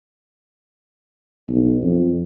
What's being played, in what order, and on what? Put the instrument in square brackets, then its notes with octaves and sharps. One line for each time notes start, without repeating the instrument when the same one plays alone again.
[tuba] B1
F2